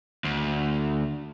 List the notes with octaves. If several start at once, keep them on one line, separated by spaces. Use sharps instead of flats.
D2